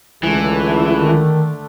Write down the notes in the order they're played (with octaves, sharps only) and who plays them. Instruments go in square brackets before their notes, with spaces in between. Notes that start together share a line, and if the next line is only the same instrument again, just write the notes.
[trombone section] C#2 [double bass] D3 A3 [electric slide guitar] E3
[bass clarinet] D#3